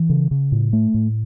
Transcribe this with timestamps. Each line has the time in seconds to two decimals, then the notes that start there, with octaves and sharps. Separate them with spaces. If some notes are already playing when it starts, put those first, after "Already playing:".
Already playing: E3
0.09 C#3
0.31 C#3
0.52 A2
0.73 A3
0.94 A2